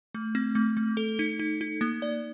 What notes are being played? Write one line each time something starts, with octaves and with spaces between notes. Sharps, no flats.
A3
C4
A3
A3
A4
D#4
D#4
D#4
A#3
D5